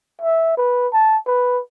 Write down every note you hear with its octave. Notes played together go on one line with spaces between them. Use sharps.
E5
B4
A5
B4